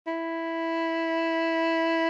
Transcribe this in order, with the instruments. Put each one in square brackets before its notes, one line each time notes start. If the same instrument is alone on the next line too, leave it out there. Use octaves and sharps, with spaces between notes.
[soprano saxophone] E4